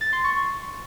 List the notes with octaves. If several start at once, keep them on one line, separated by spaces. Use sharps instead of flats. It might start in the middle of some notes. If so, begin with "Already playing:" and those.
A6
C6
C#6